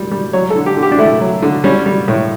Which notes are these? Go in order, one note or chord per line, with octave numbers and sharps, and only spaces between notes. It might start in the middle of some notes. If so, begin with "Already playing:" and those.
Already playing: G3
G3
F#3 C#5
A4
D3
G4
D3
G4
D4
A3 E4
F#3
D3
G3 C#4
G3
A2